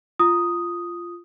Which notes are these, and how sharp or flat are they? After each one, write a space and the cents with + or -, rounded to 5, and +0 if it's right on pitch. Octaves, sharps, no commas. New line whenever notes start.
F4 -10 D#6 +0